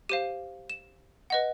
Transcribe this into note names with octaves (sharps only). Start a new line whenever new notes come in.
G4 C5 F5 D#7
E7
B4 D#5 F#5